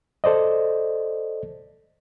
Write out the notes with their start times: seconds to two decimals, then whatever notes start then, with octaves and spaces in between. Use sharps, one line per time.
0.24 A4 C5 D5 D#5